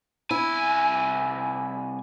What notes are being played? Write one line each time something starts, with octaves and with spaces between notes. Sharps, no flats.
C2 E4 G#5